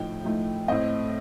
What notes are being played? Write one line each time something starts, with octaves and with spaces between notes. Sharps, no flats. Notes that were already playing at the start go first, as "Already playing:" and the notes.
Already playing: A2 F3 A3 D#4 G5
A2 F3 A3 D#4
A2 A3 C4 D#5